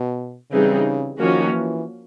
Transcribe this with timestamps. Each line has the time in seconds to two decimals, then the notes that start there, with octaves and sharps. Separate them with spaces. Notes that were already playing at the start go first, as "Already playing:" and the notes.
Already playing: B2
0.51 C#3 E3 G3 C4 D#4 G#4
1.19 D#3 F3 A#3 C#4 F#4
1.52 E3